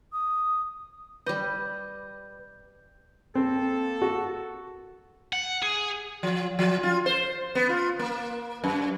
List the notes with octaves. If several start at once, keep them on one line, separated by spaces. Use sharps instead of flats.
D#6
G3 B4 D#5 D6 G6
A#3 C4 A4
F#4
F#5
G#4
F3
F3
F4
C5
B3
F4
A#3
F#2